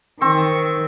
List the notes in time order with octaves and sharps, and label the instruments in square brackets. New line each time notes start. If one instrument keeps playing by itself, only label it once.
[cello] D#3 [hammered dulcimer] C4 [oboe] C#6